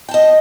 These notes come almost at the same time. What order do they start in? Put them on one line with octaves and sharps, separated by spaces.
G5 A5 D#5